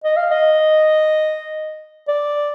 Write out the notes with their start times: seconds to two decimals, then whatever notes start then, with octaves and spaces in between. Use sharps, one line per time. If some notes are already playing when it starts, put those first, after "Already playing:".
0.04 D#5
0.17 F5
0.31 D#5
2.08 D5